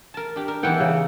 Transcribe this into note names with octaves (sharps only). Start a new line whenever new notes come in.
A#4 A5
D4 G4
A#4
E3 B3 D#4 F#5 G5
C#3